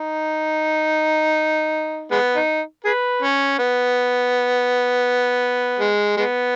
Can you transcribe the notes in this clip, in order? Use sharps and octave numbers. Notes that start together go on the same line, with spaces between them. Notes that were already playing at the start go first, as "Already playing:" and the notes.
Already playing: D#4
G#3 B3
D#4
G#4 B4
C#4
B3
G#3
G#3 B3